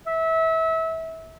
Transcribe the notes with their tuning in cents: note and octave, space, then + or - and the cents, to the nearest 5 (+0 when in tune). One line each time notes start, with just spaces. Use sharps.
E5 -25